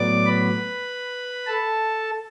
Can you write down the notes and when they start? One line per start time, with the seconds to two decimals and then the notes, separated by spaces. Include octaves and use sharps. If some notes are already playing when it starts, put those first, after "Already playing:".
Already playing: A2 F#3 B3 D5 D6
0.26 B4 B5
1.46 A4 A5